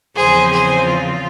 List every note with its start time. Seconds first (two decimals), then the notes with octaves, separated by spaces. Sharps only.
0.16 E2 C#3 F3 C4 G#4 C5
0.51 G#4 C5
0.87 F4